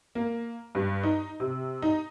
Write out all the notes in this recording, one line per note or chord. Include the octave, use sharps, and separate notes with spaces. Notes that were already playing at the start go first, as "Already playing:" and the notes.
A#3
G2
D#4
C3
D#4